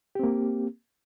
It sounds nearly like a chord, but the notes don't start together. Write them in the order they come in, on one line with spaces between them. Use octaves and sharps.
G4 C4 A#3